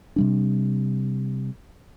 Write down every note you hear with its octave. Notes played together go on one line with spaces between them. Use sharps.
C3 G3 D4